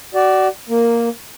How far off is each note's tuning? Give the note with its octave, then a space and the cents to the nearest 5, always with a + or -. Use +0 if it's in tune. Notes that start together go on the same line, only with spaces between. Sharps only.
F#4 +25 D5 +0
A#3 +0 A#4 -10